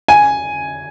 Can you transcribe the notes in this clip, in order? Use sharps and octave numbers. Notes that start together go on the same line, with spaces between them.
G#5